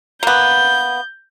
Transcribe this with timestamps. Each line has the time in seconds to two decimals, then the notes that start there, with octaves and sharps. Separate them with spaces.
0.23 A#3 B3 G6